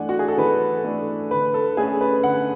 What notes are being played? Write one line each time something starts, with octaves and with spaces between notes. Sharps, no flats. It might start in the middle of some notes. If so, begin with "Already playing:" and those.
Already playing: E3 A3 D4 F#5 G#5
F#4
G#4
A4
E3 B4
A3 D4
D3 B4
A4
A3 C#4 G#4
B4
D3 F#5